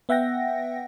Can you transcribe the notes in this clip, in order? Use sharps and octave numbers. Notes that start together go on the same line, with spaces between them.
B3 E5 F#5 G5 A#6